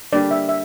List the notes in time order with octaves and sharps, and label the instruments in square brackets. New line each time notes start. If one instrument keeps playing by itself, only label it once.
[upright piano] D3 G3 A#3 D4 G4 [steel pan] D5
[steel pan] E5
E5